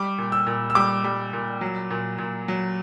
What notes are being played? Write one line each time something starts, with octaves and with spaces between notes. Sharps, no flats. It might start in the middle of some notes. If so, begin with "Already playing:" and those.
Already playing: G3 D6
A#2
E6
A#2
E6
G3 D6
G3
A#2
F#3
A#2
A#2
F#3